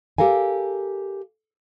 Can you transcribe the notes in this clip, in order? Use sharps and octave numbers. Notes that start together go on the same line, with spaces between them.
G4 A4 A#4 F5 G#5